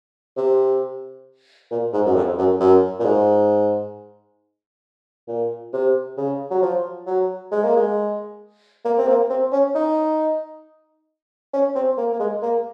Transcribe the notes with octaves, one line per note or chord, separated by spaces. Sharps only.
C3
A#2
G#2
F#2
F2
F#2
F#2
A#2
G#2
A#2
C3
C#3
F#3
F3
F#3
G#3
A#3
G#3
A#3
C4
A#3
C4
C#4
D#4
C#4
C4
A#3
A#3
G#3
A#3